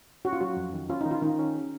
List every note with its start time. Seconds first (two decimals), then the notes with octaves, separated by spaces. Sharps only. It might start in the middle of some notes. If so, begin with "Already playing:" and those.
0.25 C#4 F#4
0.33 F4
0.41 F#3 F#4
0.57 F2
0.74 D#3
0.90 C#4 F4
1.01 D#4
1.06 D#3
1.11 F4
1.22 D#3 D#4
1.39 C#4
1.54 G#4